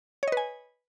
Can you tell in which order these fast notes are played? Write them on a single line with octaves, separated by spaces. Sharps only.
C#5 D#5 B4 G#5